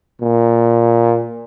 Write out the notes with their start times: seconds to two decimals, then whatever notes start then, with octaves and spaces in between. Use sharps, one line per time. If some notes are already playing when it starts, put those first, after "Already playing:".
0.22 A#2